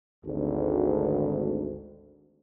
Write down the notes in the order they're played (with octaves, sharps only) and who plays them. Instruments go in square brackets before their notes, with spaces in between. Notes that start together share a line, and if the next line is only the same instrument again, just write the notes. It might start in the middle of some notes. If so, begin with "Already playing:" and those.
[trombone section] G#1 D2